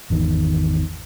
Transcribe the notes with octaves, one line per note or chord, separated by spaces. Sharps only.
G#1 E2 D#3